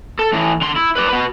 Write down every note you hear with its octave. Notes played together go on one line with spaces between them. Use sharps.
A4
A2 E3
D3 C6
E4
B4 D5
F#4 B4